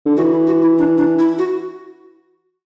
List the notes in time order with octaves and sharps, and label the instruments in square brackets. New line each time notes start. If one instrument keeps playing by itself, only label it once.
[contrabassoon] D3
[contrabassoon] E3 [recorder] F#4
[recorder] E4
F#4
E4
D4
D4
E4
F#4